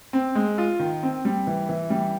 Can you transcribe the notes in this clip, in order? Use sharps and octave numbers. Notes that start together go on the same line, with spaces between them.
C4
G#3
F4
D#3
C4
G3
E3
E3
G3